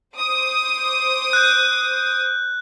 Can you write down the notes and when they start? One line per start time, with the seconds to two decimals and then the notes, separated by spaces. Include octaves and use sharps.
0.17 C5 D6 D#6
1.33 F#6 G6